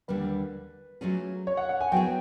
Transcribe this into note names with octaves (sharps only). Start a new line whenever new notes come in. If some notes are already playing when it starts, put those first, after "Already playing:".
D#2 D3 G3 A#3 B4
F#3 A3 C#4 F4 G#4
C#5
F#5
F#5
G#5
F#3 B3 E4 G#4 G5